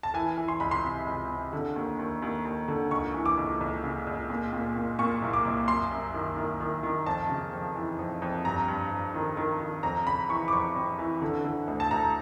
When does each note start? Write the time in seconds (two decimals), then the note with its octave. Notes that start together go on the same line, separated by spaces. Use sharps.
0.03 A5
0.14 E3 G#5
0.37 E3
0.48 C6
0.60 C#2 B5
0.71 C6
0.83 C3
1.07 C#2
1.30 C3
1.53 D3
1.76 D#2
1.99 D#2
2.22 D#2
2.45 D#2
2.68 D3
2.91 C#2 C#6
3.14 E3
3.26 D6
3.37 C#2
3.61 C#2
3.84 C#3
4.07 C#2
4.29 A#2
4.53 A#2
4.76 A#2
4.99 A#2 C#6
5.22 C2
5.33 D6
5.45 C2
5.68 F#2 C6
5.91 F#2
6.14 D#3
6.37 D#3
6.60 D#3
6.83 D#3
7.06 F2 A5
7.29 C#3
7.53 F2
7.75 E3
7.99 F2
8.22 F2
8.45 G2 A#5
8.68 G2
8.91 G2
9.14 D#3
9.37 D#3
9.60 D#3
9.83 F2 A#5
10.06 C#3 B5
10.29 E3 C#6
10.48 D6
10.53 F2 C#6
10.75 F2
10.99 E3
11.22 D3
11.44 D3
11.68 D2
11.80 A5
11.91 D2 A#5